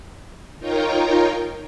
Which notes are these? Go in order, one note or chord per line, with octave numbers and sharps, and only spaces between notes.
D#4 F4 A#4 C#5 G5 A#5